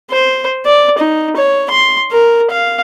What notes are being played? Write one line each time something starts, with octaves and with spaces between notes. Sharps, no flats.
C5
D5
D#4
C#5
C6
A#4
F5